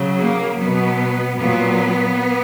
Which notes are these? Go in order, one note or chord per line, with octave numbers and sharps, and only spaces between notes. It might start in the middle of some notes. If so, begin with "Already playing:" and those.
Already playing: C#3 F#3
A#3
B2 F#3 B3
A#2 F#3 B3